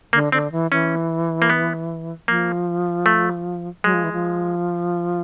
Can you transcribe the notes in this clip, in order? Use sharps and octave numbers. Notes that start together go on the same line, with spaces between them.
D3 A#3
D3 C4
E3
E3 C#4
A#3
B3
F3 A#3
A3
F#3 G#3
F3
E3
F3